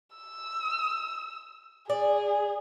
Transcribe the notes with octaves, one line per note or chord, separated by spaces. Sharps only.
E6
G#4 D5